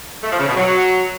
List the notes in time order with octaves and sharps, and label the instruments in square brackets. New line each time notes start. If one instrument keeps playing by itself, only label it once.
[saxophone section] A3
F3
C#3
B2
F#3